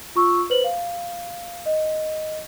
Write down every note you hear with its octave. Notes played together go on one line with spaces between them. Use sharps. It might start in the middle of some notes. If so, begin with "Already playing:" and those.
F4 C#6 E6
B4 C5 F#7
F5
D#5